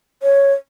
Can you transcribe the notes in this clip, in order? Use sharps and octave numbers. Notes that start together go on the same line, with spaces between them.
C#5